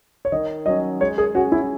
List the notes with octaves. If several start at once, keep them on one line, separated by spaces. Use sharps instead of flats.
C#5
D#3 D#5
F#3 C#4 D#5
G#3 C#5
G#4
C#4 F#4 G#4
E4